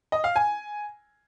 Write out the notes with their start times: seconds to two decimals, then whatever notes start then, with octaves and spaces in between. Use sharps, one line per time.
0.12 D#5
0.24 F5
0.36 G#5